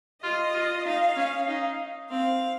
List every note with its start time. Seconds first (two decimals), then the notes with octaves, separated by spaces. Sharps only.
0.22 F4 D#5
0.54 F4
0.85 D#4 F5
1.16 C#4
1.48 D#4
2.11 C4 F5